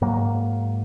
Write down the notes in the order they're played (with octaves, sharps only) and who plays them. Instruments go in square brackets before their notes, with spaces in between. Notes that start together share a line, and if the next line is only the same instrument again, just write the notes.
[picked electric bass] G#2 F#3 A#3